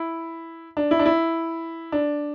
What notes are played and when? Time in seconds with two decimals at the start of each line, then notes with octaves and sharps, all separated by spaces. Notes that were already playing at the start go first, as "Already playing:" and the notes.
Already playing: E4
0.77 D4
0.91 E4
0.99 D4
1.06 E4
1.92 D4